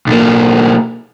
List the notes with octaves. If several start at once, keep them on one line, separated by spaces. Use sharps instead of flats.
B1 A#3